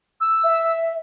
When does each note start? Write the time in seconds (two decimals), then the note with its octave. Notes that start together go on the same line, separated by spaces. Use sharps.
0.21 E6
0.43 E5